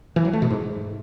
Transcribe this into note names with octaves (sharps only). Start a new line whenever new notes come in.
E3
F#3
A3
B2
G#2